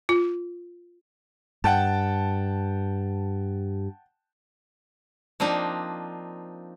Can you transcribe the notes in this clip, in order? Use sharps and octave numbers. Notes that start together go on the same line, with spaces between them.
F4
G2 F#5 G5 A5
F3 A#3 C4 D4 D#4